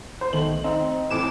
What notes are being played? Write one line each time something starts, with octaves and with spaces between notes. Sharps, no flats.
C5
B1 D#3 A3 F#7
C4 D#4
F2 A2 E3 D6 E7